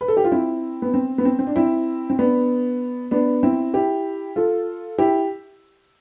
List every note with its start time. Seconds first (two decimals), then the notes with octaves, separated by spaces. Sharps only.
0.01 B4
0.08 A4
0.17 G4
0.25 F4
0.32 C4 E4
0.82 B3
0.94 C4
1.18 B3
1.25 C4
1.39 C4
1.47 D4
1.56 C4 E4
2.10 C4
2.19 B3 D4
3.11 B3 D4
3.43 C4 E4
3.74 E4 G4
4.36 F4 A4
4.98 E4 G4